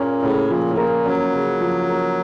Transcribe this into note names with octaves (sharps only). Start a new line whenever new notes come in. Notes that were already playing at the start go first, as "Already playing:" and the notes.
Already playing: A#2 A#3 C#4
A2 C#3
A#2 F3
A2
A#2 A#3
F#3 C#4
C#3
F3
A#3